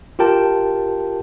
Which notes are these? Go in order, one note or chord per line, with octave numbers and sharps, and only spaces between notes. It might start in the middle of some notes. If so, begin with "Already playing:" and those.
F4 G4 A#4 G5 A5